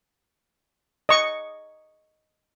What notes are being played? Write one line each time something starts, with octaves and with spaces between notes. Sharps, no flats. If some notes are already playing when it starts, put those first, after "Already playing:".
D#5 C#6